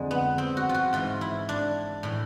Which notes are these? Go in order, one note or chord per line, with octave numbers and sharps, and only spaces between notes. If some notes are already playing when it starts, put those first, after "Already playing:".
Already playing: F2 D3 G#3
B3
C4
F#4
F4
F#4
G#2 E3 F4
E4
D4
A2 E3